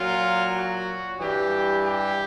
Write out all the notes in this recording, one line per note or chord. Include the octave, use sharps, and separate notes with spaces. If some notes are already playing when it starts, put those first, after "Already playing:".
Already playing: A#2 F#3 F4
F#4
G2 E3 G3 G4
G4